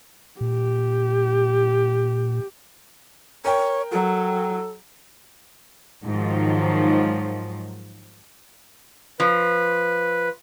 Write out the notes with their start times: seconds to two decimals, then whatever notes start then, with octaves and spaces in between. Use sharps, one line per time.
0.41 A#2 G4
3.45 A#4 C#5 G5
3.92 F#3 A4
6.04 G#2 D#3 F3 F#3
9.20 F3 B4